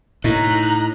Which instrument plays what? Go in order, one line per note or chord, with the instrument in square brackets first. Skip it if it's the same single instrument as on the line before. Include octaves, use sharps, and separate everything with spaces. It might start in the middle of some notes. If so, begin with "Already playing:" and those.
[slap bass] A2 [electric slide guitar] D#4 [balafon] E4 [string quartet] A#5 F#6